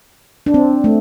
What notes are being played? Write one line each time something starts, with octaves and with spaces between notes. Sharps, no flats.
D4
C4
A3